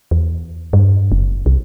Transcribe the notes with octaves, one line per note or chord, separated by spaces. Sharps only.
E2
G2
F#1
C2